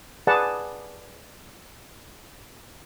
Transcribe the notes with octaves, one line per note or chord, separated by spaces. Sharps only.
G#4 B4 D5 F#5 A5